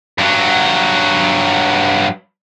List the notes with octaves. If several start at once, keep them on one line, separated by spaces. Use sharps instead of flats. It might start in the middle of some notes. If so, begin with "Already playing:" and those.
G2 F#3